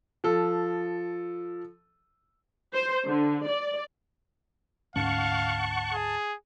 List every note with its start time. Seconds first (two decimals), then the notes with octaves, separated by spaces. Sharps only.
0.24 F3 A4
2.73 C5
3.06 D3
3.48 D5
4.96 D2 G#2 C#4 F5 F#5 A5 C#6
5.94 G#4